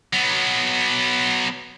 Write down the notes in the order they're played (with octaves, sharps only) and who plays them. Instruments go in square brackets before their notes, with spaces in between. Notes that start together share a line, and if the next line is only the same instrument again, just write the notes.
[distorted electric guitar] F#3 B3